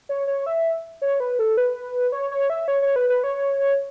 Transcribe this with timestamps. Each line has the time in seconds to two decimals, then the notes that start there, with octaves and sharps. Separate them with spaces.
0.09 C#5
0.27 C#5
0.46 E5
1.02 C#5
1.20 B4
1.39 A4
1.57 B4
2.12 C#5
2.31 C#5
2.50 E5
2.68 C#5
2.82 C#5
2.96 B4
3.09 B4
3.24 C#5